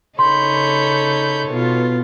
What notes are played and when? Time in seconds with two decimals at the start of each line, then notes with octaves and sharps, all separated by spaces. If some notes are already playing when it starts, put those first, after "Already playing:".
0.19 C#3 D#4 A4 C#5 B5 C6 G6
1.49 B2 B3 F4